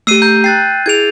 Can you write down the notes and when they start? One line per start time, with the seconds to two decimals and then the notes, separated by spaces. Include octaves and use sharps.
0.07 A3 G4 E6 C7 D#7
0.22 A#5 G6
0.44 G5 F#6 A6 C7
0.86 E4 G#4 G#6 D7 F7